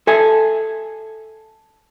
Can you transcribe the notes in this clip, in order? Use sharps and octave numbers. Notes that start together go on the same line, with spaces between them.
A4 E5 G#5